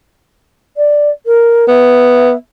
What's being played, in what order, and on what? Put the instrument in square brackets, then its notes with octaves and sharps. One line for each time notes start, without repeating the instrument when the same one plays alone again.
[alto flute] D5
A#4
[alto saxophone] B3 [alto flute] E5